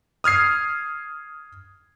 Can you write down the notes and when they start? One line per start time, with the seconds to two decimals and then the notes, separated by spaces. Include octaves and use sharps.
0.24 D#6 F6 G#6 C7